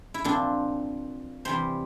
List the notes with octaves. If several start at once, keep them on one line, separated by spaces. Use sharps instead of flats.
E4
A#2 F3 C4 D4
C3 E3 G3 C5